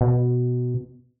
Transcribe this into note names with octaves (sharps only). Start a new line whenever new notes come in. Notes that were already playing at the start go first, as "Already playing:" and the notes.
B2